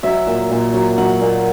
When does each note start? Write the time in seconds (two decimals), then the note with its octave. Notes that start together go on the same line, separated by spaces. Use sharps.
0.03 F#3 E5
0.27 A#2
0.50 A#2
0.74 F#3
0.98 F#3 F#5
1.22 A#2